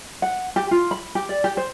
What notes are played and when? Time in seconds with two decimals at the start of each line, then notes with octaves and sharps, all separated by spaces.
0.22 F#5
0.56 G4
0.71 F4
0.91 B5
1.15 G4
1.29 D5
1.44 G4
1.57 C5